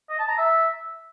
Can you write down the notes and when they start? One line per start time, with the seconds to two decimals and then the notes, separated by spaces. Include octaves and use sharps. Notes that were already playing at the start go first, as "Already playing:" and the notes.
0.09 D#5
0.19 A5
0.28 A#5
0.38 E5